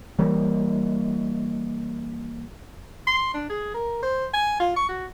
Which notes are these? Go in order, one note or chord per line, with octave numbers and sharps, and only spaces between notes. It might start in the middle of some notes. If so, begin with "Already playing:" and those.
E3 G3 A#3
C6
D4
G#4
A#4
C5
G#5
F4
C#6
F#4